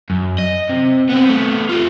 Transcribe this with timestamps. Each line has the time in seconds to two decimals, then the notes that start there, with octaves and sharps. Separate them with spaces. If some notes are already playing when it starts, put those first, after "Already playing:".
0.10 F#2
0.38 D#5
0.69 C3
1.09 B3 C4
1.25 A3 B3
1.69 F4 G4